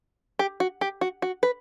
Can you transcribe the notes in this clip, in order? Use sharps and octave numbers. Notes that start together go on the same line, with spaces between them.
G4
F#4
G4
F#4
F#4
B4